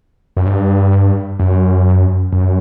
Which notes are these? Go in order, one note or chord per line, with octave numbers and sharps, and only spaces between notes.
F#2
G2
F#2
F#2